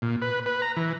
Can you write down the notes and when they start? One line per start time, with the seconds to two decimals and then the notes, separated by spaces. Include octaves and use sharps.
0.02 A#2
0.22 B4
0.46 B4
0.62 A#5
0.77 E3